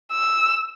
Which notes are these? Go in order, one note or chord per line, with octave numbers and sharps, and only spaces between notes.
E6